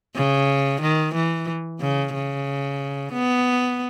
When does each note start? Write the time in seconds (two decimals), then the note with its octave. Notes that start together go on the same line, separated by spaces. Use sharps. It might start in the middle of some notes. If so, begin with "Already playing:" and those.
0.16 C#3
0.81 D#3
1.15 E3
1.80 C#3
2.14 C#3
3.13 B3